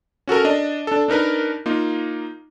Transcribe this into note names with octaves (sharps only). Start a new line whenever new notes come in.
C#4 F#4 A4 A#4
D4 D#5 A5
D4 A4
D4 D#4 A#4 B4
A#3 D#4 F4